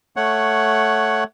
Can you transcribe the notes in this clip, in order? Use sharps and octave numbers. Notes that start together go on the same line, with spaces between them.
A3 C#5 F#5